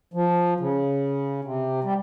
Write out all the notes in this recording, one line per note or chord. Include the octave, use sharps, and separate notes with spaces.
F3
C#3
C3
G3